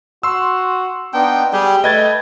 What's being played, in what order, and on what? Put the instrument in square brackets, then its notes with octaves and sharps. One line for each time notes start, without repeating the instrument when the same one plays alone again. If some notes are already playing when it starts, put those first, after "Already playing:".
[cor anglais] F#4 [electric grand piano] C6 E6
[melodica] B3 D4 [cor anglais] D#4 [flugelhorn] G5
[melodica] G3 G4 [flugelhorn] G#4 [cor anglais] G5
[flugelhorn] A3 [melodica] B4 [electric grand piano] D#5 G#6 A6